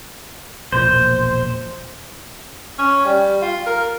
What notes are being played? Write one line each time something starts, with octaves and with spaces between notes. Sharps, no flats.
E1 A#1 A#2 C5
C#4
G3
F4
A#4